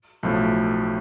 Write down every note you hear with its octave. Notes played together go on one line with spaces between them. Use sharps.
B1 A2 F3 A3